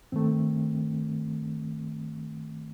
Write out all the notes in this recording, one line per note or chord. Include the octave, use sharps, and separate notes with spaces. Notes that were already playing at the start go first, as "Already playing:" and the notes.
G2 D#3 A3 C4